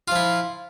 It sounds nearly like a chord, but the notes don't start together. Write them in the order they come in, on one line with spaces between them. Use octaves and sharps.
F4 F3 E4